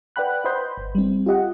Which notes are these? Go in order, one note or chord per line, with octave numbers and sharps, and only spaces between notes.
B4 D5 F#5 G5 B5 F#6
B4 C5 D#5 B5 C6 G6
G1
G3 C4
F4 G4 D#5 F#5